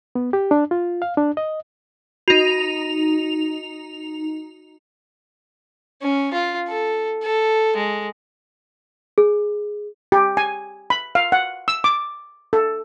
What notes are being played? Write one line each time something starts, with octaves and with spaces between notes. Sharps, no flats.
B3
G4
D4
F4
F5
D4
D#5
D#4 F#4 F7
C#4
F4
A4
A4
G#3
G#4
G4
G#5
B5
F5
F#5
E6
D6
A4